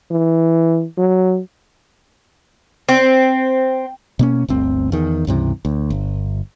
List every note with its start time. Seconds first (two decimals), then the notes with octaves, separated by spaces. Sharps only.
0.11 E3
0.98 F#3
2.89 C4
4.19 B2 A#3 C#4
4.49 G1 D2 C4
4.92 E2 D#3
5.27 C#2 G2 C3 E3
5.65 D2
5.90 G1